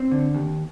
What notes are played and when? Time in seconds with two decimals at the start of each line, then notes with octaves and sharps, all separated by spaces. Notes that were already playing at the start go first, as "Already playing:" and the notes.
Already playing: C4
0.11 D3
0.34 D#2